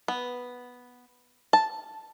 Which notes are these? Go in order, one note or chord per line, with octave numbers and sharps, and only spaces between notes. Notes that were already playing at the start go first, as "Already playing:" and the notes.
B3
A5